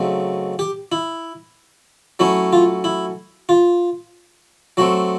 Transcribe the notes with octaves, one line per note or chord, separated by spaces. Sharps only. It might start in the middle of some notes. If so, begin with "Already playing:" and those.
Already playing: C#3 F#3 A3 C4 D#4
G4
E4
F#3 A3 C#4 E4
F4
E4
F4
F#3 A3 C4 F#4